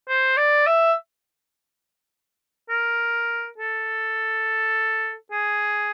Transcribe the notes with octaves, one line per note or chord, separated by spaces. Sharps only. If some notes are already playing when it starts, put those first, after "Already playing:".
C5
D5
E5
A#4
A4
G#4